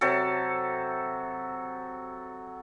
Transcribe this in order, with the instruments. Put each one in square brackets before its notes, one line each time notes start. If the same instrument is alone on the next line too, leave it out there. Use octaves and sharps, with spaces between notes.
[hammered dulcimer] C3 F#3 A4